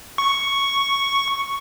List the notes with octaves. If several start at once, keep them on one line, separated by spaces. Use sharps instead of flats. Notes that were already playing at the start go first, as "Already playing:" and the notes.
C#6